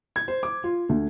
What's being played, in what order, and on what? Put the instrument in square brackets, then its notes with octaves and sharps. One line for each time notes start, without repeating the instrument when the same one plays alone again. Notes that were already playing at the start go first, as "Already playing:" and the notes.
[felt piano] G#6
C5
D6
F4
D2